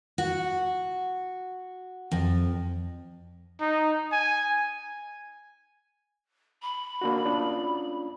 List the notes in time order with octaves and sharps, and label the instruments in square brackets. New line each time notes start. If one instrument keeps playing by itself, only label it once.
[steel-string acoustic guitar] F#4
F2
[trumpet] D#4
G#5
[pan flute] B5
[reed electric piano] A#3 D4 F#4
C#4 D4 F4